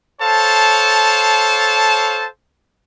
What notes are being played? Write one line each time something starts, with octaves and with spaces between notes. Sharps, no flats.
A4 C5 C#5 F5 A5